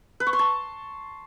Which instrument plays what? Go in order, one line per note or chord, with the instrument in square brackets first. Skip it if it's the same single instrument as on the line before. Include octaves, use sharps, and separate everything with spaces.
[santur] B4
C#6
C6
A5